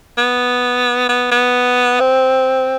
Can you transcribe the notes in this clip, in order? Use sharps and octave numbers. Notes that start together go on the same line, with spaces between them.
B3
B3
B3
C4